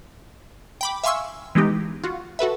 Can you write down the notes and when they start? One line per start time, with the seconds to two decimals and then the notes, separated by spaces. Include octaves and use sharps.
0.81 G5 B5 D6
1.04 E5 F5 G#5 C6 C#6 E6
1.55 E3 G#3 B3 D#4 G4
2.04 F4 F#4
2.39 F#4 A4 B4 E5